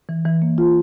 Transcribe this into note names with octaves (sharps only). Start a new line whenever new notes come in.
E3
E3
A#3
F4